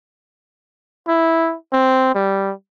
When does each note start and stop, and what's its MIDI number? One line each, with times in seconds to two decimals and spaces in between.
1.08 1.55 64
1.73 2.14 60
2.15 2.52 55